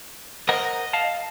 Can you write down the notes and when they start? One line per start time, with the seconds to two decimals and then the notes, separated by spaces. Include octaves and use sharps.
0.49 A#4 C5 D#5 F#5
0.93 F5 A5